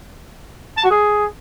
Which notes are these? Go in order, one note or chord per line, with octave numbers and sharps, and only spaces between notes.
A5
F#4
G#4